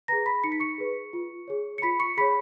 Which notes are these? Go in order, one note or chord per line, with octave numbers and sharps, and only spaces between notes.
G#4 B4 A#5 A#6
B5 B6
D#4 C#7
B6
C#6 C#7
G#4 B4
F4
G#4 C#5
C#7
F4 B5 B6
C#6 C#7
G#4 C#5 B5 B6